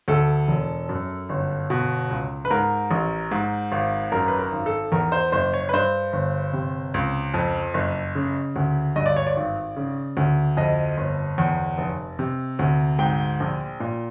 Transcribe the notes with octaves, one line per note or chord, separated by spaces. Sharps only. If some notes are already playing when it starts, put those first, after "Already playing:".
D2 A4
E1
F#2
G1
B2
C#2
B4
G#2 A#4
A1
G#2
G#1
F#2 A#4
B4
A#4
G#1
A4
E2 A#4
C5
F#1 C5
C#5
B4
G2 C5
G1
C3
C#2
F2
F#1
C#3
D2
G2 D#5
D5
C#5
D5
G#1
C#3
D2
F2 D#5
G1
E2
F1
C3
D2
G#2 G5
A#1
A#2